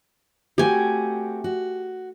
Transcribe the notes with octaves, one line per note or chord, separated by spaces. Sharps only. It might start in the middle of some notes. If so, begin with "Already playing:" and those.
A3 C4 F#4 G4 G#5
F#4